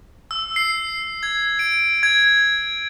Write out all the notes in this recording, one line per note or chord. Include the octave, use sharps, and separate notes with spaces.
E6
C7
G#6
D7
G#6